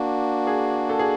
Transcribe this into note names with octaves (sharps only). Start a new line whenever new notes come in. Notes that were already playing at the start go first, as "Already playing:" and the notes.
Already playing: A#3 D4 F#4
G#4
A4
G#4